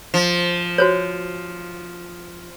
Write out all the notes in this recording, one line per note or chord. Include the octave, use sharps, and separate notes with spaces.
F3
F#4 C5 C#5